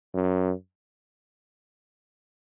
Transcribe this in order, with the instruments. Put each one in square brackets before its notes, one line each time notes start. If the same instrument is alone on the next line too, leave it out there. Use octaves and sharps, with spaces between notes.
[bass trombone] F#2